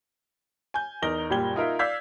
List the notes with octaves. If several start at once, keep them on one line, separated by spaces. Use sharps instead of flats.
G#5 G6
E2 D#4 A#4 A#6 G7
F#1 A#2 G3 G4 G#6 G7
D#4 F4 A#4 E5
D5 F5 E6 G6 G#6 B6